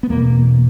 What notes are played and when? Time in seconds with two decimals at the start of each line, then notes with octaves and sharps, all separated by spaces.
0.03 B3
0.10 E2 B2 A#3